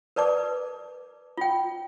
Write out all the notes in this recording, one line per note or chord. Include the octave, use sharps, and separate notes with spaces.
A#4 B4 D5 A5 D6
F4 G5